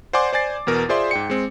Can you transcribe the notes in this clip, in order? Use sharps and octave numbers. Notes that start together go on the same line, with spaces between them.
C5 D5 F#5 G#5 C6 D6
C5 D5 G#5 A6 C7
E2 B2 A#4
F4 G#4 C5 D5 E5 C6
G#2 G5 C#7
G#3 C4